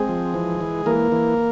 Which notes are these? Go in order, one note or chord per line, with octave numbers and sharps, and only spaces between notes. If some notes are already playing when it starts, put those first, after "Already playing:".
Already playing: G#3 C4 G#4
F3
E3
E3
E3 A#3 A#4
E3